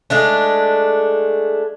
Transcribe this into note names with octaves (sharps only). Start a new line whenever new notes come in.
G#3 A3 D4